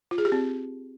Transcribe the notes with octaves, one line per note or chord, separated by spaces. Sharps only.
F4
G#4
G4
C4